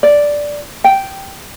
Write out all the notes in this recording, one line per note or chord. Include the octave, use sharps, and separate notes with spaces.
D5
G5